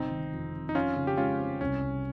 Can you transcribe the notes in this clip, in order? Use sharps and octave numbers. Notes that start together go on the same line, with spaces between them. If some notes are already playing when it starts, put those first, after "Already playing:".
Already playing: G1 C3 C4 D#4
D#3
F2
F2
D#4
F2 C#4 F4
C#3
G4
G#3 C#4 F4
C4
C2 C#4
C2